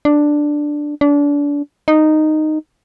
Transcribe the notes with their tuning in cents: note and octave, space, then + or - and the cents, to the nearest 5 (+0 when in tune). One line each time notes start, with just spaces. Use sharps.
D4 +5
D4 -30
D#4 -10